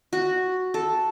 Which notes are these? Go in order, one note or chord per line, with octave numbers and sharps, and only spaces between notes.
F#4
A4